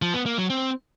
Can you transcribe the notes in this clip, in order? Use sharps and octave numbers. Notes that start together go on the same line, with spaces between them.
F3
B3
A#3
F#3
C4